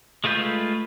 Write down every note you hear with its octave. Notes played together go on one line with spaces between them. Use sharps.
G#3 A3 F4 B4 G6